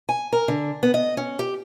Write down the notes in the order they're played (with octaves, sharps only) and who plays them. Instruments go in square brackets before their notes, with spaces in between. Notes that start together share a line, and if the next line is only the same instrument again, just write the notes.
[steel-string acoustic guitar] G#5
A#4
D3
B3
D#5
C#4
G4